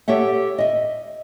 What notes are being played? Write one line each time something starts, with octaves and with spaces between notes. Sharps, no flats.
G4 A4 C#5 E5 F#5
D#5 E5